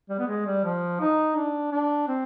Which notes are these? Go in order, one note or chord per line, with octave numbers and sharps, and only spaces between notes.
G3
B3
G#3
G3
F3
D#4
D4
D4
C4